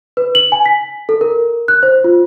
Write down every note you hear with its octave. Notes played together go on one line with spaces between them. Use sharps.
B4
F#7
G#5
B6
A4
A#4
F#6
C5
F4